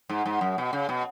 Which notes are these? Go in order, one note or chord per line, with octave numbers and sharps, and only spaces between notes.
G#2
G#2
F#2
B2
C#3
B2